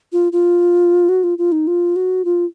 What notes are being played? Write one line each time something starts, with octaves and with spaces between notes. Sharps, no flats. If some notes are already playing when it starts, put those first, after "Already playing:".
F4
F4
F#4
F4
F4
D#4
F4
F#4
F4